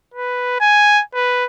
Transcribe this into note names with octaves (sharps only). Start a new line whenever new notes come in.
B4
G#5
B4